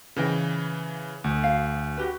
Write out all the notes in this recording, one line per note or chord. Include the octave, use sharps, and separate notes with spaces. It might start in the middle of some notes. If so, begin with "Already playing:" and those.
C#3 E3 C5 D#5 G5
D2
F5
F#4 G4 B4